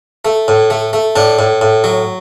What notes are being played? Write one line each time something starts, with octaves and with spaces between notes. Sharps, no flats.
A3
A2
A3
A3
A2 D4
A2
A2
F#3